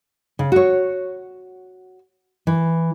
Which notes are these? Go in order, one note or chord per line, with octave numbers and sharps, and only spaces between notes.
C#3
F#4 C#5
E3